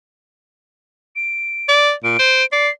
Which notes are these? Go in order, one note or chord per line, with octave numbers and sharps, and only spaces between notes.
D7
D5
A#2 D7
C5
D5 C7